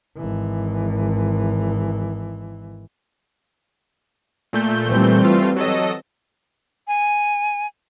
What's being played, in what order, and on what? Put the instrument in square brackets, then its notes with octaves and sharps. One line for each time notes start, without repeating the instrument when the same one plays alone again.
[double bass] G#1 E3
[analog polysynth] A#2 A3 G6
[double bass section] E3 G3 C4
[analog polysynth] A3 F4
F#3 A4 D#5
[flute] G#5